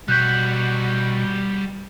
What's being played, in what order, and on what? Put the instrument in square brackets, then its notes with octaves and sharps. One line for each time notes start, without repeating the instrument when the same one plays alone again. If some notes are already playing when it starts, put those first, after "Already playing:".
[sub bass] B2 [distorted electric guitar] G3 F#4 [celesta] F#6 G6 B6